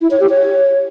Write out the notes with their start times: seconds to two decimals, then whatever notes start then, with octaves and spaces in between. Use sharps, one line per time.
0.01 E4
0.11 C#5
0.20 G4
0.30 C#5